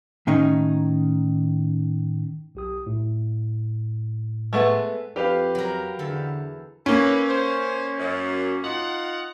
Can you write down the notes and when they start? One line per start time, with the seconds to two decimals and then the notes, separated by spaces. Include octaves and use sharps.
0.27 A2 D#3 C#4 D#4
2.55 B1 G4 D#6
2.86 A2
4.53 G#3 A3 B3
5.16 F2 G4 B4 F5
5.55 F#3 A#4
5.99 E2 D3 A4
6.86 A#3 C#4 A4 B4
7.29 C5
8.00 F#2
8.63 D#4 F4 F#5